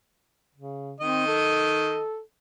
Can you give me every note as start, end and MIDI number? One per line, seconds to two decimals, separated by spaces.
0.55 0.94 49
1.00 2.00 51
1.00 1.26 60
1.00 2.00 75
1.27 2.19 69